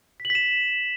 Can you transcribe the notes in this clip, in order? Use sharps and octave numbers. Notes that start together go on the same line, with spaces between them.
B6
F#7
B6
E7